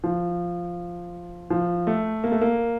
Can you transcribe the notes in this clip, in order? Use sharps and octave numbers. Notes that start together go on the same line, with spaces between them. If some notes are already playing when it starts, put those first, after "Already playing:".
F3
F3
A3
A#3
A3
A#3